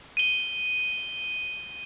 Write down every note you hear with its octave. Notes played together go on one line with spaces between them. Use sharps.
D#7 G7